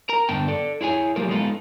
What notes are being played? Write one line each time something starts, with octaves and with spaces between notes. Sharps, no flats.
A#4 A#5
G2 D3 B3 G5 A5
A4 D5
E4 G#4 C#5 G#5
F#3 A#3 F4 G4 G#4 A#4
G#3 A3 B3 D#4 F4 A4